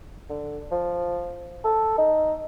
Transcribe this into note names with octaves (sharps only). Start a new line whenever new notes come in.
D3
F3
A4
D#4